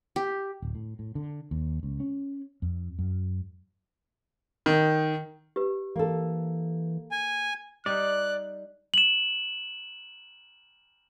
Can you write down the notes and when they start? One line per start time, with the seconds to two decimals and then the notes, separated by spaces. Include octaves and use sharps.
0.16 G4
0.62 D1
0.75 A2
0.99 A2
1.15 D3
1.51 D#2
1.83 C#2
2.00 C#4
2.62 F2
2.99 F#2
4.66 D#3
5.56 G4 B4
5.96 E3 A#3 A4
7.11 G#5
7.86 G3 D#4 D5 F#6
8.94 E7 F#7